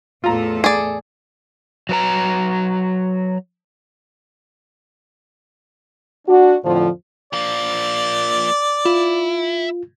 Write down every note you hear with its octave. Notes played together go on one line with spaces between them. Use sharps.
E2 A2 F4 A4 A#5
G#4 D5
F#3 B4 A#5
D4 F#4
F2 A2 D3 F3
F3 A#3 D5
E4 F4